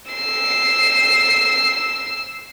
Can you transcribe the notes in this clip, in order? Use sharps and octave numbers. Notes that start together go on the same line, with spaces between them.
E6 C7